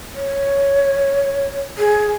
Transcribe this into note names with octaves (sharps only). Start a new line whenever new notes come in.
C#5
G#4